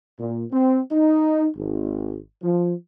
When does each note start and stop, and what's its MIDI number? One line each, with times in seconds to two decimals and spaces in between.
0.19 0.45 46
0.52 0.81 60
0.92 1.48 63
1.56 2.18 32
2.43 2.74 53